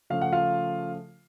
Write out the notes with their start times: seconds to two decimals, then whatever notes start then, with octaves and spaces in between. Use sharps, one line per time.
0.10 C#3 F3 A3 F5
0.22 F#5
0.33 F4 F5